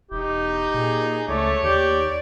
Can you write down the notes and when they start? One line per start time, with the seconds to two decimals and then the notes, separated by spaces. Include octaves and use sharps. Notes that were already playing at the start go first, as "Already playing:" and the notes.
0.12 E1 D#4 G4
0.74 A#2 G#4
1.28 C#2 A3 C#5 D5
1.63 D#2 G4 D5